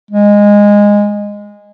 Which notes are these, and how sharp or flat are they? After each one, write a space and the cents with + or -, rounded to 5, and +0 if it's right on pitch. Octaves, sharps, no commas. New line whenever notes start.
G#3 -15